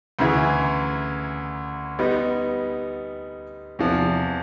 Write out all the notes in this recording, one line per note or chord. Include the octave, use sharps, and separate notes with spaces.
D2 C#3 E3
G3 B3 D#4
E2 C3 F3